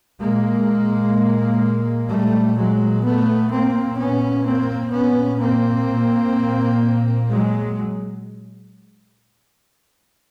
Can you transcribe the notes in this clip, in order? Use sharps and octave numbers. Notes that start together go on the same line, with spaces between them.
A#2 G#3 A#3
A#2 G3 A3
F#3 G#3
A3 B3
A#3 C4
A#2 B3 C#4
A#3 C4
B3 C#4
A#3 C4
A#2
F#3 G#3